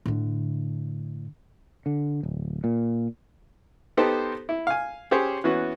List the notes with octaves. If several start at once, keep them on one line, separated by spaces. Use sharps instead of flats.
A2 D3
D3
D1
A#2
B3 D#4 G4 A4 C5
E4
F5 G#5
C#4 G4 G#4 C5 C#5
E3 B3 C#4 F#4